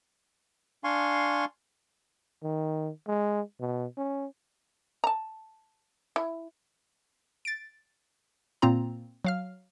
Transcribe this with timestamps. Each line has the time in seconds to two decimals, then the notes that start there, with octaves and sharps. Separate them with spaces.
0.84 D4 F5 G#5 C6 C#6
2.43 D#3
3.07 G#3
3.60 B2
3.97 C#4
5.04 A5 A#5
6.16 E4
7.45 A6 D7
8.62 A#2 A#3 C4 F4 A#5
9.25 F#3 F5 F6